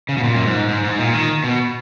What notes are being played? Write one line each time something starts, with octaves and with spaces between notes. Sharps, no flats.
C#3
B2
A#2
F#2
G#2
G#2
G#2
A#2
D#3
B2